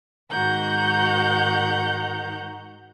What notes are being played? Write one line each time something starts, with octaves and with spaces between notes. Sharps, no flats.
G#2 D#3 F#4 F#5 A#5 G6